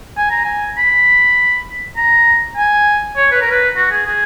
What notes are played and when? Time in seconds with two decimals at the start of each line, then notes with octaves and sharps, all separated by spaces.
0.17 G#5
0.31 A#5
0.44 G#5
0.78 B5
1.97 A#5
2.57 G#5
3.16 C#5
3.31 B4
3.41 A#4
3.51 B4
3.76 F#4
3.91 G#4
4.06 G#4